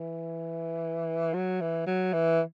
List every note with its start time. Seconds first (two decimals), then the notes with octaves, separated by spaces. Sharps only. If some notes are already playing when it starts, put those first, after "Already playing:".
Already playing: E3
1.34 F#3
1.61 E3
1.87 F#3
2.13 E3